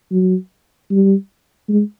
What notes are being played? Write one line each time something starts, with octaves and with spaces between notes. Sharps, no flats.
F#3
G3
G#3